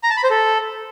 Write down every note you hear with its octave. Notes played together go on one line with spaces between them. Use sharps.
A#5
A5
B5
C5
A4